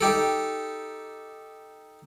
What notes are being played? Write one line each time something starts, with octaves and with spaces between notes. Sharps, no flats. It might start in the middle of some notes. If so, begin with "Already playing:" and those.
D#4 G4 A4